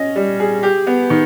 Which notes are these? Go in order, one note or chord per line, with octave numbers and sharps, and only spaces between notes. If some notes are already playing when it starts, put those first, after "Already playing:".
Already playing: C#4 D#5
G3
G#4
G4
B3
D#3